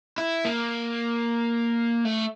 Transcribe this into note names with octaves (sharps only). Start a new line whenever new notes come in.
E4
A#3
A3